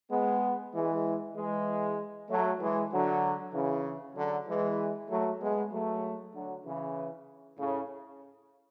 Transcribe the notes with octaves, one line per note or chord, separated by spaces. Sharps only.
G#3 B3
E3 G#3
E3 G#3
F#3 A3
E3 G#3
D3 F#3
C#3 E3
D3 F#3
E3 G#3
F#3 A3
G#3 B3
F#3 A3
D3 F#3
C#3 E3
A2 C#3